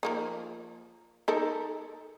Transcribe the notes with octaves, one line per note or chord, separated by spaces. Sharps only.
F3 A#3 D#4
D#4 A4 A#4